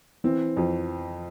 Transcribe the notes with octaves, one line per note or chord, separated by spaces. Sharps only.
E3 C4
F2